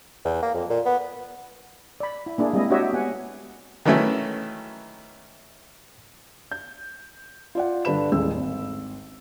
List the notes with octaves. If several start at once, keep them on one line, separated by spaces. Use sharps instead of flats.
E2
A#3
F2
A#2
B3
D5 B5
E4
A#3 D4 E4 G#4
G3 G#3 C4 E4 D#5
D4 F#4 G4 C#5 D#5 E5
B3 F#5 G#5
D#3 E3 F#3 A3 C#4 E4
G6
F4 D5 F#5
G2 D3 D4 B4 B5 E7
D#1 A1 G#3 E6
G#1